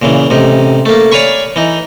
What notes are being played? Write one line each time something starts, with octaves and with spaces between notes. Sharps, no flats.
A#2 C#3 E3
A1 C3 D#4
A3 A#3
C#5 D5 F5 G#5 B5 C#6
E3 D#4